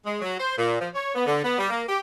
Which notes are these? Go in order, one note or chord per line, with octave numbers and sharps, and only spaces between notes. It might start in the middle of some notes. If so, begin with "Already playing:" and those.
G#3
F#3
C5
A#2
F3
C#5
B3
D3
B3
G3
A#3
G4